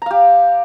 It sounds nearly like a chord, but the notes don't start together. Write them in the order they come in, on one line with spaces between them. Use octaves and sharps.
A#5 F5 G4